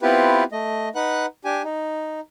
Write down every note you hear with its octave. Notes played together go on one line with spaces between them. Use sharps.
B3 C4 E4 F4 G4 B4
A3 D#5
D#4 B4 F#5 F#6
D4 G4 G#5
D#4